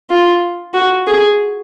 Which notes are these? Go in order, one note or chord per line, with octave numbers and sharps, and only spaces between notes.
F4
F#4
G#4